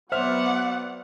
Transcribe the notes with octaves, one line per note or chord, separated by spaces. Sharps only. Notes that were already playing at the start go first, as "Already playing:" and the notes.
F#3 B3 C5 D5 E5 F#5 F6